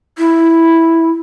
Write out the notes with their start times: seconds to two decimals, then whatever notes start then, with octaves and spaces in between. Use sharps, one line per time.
0.18 E4